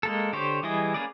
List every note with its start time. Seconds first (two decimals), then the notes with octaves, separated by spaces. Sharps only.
0.03 G#3 A#3 A4
0.33 D3 G4 C5 C#5
0.63 E3 G3 E4 G#4 D#5
0.94 A#3 C#4 G#4 B4 D5